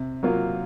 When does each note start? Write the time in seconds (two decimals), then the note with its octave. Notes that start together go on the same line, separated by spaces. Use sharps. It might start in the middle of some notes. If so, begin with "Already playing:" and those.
Already playing: C3
0.23 F#3 A#3 F4